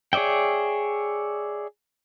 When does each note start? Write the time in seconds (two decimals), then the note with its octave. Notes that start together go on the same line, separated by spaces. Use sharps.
0.13 G#4 C#5 D5 E5 G5